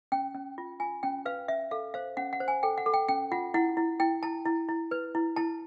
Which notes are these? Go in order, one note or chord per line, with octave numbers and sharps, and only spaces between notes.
C#4 G5
C#4
F4
F4 G#5
C#4 G5
B4 F5
C#4 E5
A4 F5
C5 F5
C#4 F#5
F#5
C5
G#5
A4 G5
F#5
A4
G5
C#4 G5
F4 F#5
E4 F#5
E4
E4 G5
E4 A5
E4
E4
B4
E4
E4 A5